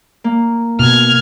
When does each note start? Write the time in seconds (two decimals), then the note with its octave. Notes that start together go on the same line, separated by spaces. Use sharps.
0.24 A#3
0.79 B2 F6 G#6